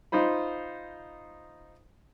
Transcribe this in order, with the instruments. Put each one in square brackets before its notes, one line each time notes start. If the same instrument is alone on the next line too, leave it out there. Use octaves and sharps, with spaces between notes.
[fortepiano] D#4 F4 C5 B5